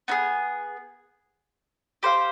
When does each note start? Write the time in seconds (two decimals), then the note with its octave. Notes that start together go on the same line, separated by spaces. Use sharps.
0.08 B3 D#4 G#4
2.03 G4 C5 F5